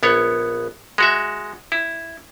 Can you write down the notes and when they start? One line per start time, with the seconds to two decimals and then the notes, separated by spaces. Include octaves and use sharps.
0.03 A#1 B3 C#5
0.98 G#3 F#4 E5
1.72 E4